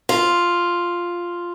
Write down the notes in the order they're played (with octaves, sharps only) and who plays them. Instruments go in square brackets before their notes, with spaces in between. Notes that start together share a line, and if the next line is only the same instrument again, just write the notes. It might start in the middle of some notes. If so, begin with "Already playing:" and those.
[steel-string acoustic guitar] F4